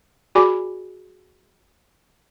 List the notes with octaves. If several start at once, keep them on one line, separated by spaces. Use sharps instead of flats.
F#4 G#4 D5 G#5 B5 D6